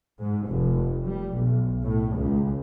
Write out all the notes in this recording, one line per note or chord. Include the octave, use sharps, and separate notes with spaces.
G#2
F1
G3
B1
A2
C#2